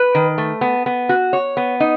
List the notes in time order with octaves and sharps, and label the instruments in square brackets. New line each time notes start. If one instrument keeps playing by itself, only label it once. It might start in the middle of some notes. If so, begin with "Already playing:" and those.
Already playing: [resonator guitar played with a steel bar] B4
D#3
A3
B3
B3
F#4
C#5
B3
D#4